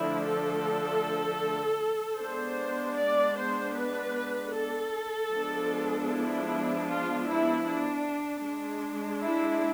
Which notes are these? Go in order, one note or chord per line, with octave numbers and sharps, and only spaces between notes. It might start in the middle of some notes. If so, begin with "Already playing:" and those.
Already playing: D3 F3 A3 D4 E4
A4
G#3 B3 D4 C5
D5
C5
B4
A4
F3 G#3 B3 D4
E4
F4
E4
D4
G#3 D4
E4